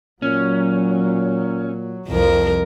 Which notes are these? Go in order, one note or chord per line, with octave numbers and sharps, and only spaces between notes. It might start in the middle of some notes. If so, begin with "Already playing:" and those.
A#2 F#3 C#4
C2 F2 F3 A#4